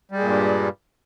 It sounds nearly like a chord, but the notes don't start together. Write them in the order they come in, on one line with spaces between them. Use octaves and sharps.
G3 G#3 A#2 G2